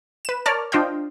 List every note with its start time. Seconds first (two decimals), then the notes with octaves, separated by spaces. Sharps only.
0.25 B4 E7
0.46 A#4 C#5 D5 A5 F6
0.72 D4 F4 C5 D#5 F5 G5